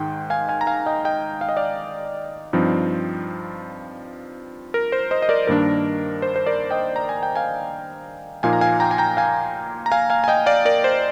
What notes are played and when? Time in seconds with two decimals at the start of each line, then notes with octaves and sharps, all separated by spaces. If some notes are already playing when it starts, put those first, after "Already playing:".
Already playing: G#2 D#3 G#3 G5
0.30 F5 G#5
0.49 F5 G#5
0.61 A#5
0.67 F5 G#5
0.86 D#5 G5
1.05 D#5 G5
1.41 F5
1.49 D#5
1.57 D5 F5
2.53 G2 F3 C4 D#4
4.74 A#4
4.92 C5
5.11 C5 D#5
5.22 D#5
5.29 A#4 D5
5.47 G2 D#3 A#3 D4 A#4
6.22 C5
6.36 C5
6.46 A#4 D5
6.71 D#5 G5
6.96 A#5
7.09 G#5
7.23 G5
7.36 F5 G#5
8.43 A#2 F3 A#3 D#4 F5 G#5
8.53 A#5
8.61 F5 G#5
8.80 G5 A#5
8.91 G#5
8.98 G5 A#5
9.17 F5 G#5
9.86 A#5
9.92 F5 G#5
10.10 F5 G#5
10.24 G#5
10.28 D#5 G5
10.46 D5 F5
10.65 A#4 D5
10.84 C5